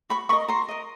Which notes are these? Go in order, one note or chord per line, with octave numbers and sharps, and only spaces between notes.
F#4 B5 C#6
A#4 D#5 B5 C#6
F#4 A#5 C6
A#4 D#5